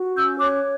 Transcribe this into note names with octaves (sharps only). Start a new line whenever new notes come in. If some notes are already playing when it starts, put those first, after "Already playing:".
Already playing: F#4
C#4 E6 G6
C#5 D6 F#6